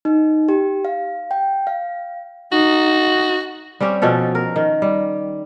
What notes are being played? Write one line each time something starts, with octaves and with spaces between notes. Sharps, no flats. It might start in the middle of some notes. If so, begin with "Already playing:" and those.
D#4
G4
F5
G5
F5
D#4 F#4
G3 C4 C#4 G4
B2 F3 C#4 A4
A#4
D#3
G3